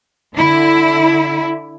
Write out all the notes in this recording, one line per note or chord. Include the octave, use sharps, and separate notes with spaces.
D3 E4